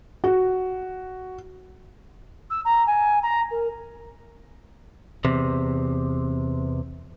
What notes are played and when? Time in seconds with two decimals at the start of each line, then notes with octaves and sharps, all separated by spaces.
0.24 F#4
2.50 E6
2.65 A#5
2.86 G#5
3.22 A#5
3.51 A#4
5.25 E2 C3